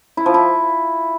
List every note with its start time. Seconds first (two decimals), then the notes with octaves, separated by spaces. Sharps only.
0.17 E4
0.26 F3
0.34 E4